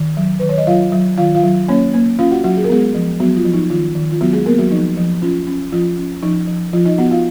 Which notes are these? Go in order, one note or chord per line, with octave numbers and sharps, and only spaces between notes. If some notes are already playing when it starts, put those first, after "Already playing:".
Already playing: D#3
F#3
D#3 B4
C#5
D#5
F#3 F4 F5
F#3
D#3 F4 F5
F4 F5
F#3
A#3 C#4 C#5
A#3
C#4 F4 F5
F#4 F#5
F#3 F#4 F#5
G#4
A#4
G#3 B3 G#4
F3
F#3 B3 F#4
F4
F3
D#4
D#3 F4
D#3
F4
F#3 B3 F#4
G#3 G#4
A#3 B3 A#4
F#3 F#4
F3 D#4
F3
C#4 F4
C#4
F3 F4
C#4
F3 D#4
F3
F3 F4
D#4 D#5
B3 F#4 F#5
F4 F5